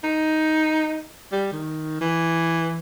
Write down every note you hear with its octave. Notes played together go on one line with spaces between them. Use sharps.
D#4
G3
D#3
E3